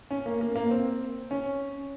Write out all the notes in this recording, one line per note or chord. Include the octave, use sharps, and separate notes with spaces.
C#4
A#3
A#3
A#3
C4
C#4